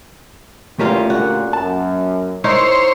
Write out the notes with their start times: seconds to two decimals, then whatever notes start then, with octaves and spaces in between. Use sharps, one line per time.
0.79 E2 A3 A#3 C#4 F4 G4 A#4
1.10 A#2 D3 F#4
1.53 F#2 A5
2.44 D#4 E4 A#4 C5 C#5